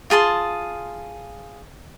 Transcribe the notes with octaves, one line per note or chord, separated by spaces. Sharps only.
F4 G#4 A5 C6